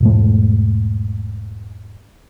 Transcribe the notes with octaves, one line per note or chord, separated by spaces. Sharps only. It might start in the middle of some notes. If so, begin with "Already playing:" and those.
E1 G#2 A3